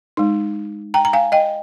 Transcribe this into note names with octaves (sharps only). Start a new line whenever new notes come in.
G#3 D#4
G5 A#5
A#5
F5 G#5
D#5 G5